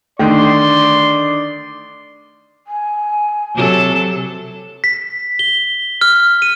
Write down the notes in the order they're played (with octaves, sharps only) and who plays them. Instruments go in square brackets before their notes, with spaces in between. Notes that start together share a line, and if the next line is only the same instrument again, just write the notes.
[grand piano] D3 D#3 [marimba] A3 [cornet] D5 [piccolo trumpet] C6
[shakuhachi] G#5
[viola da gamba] C3 F#3 A4
[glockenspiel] B6
G7
F6
D#7